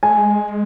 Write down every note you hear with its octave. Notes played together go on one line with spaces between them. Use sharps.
G#3 G#5
A3
G#3